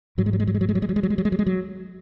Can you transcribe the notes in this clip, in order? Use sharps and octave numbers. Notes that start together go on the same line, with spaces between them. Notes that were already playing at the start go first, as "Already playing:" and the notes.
G#2 F#3
G#3
F#3
G#3
F#3
G#3
F#3
G#3
F#3
G#3
F#3
G#3
F#3
G#3
F#3
G#3
F#3
G#3
F#3